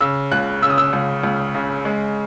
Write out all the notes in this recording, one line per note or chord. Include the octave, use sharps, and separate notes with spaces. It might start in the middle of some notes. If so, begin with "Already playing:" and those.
C#3 E6
C#2 F#6
C#3 E6
D#6
E6
C#2
C#2
C#3
G#3